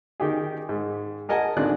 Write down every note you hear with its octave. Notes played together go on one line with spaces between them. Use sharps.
D#3 G4 G#4
G#2
G#4 A#4 D#5 F#5 G#5 A5
G#1 A2 D#3 D4 F#6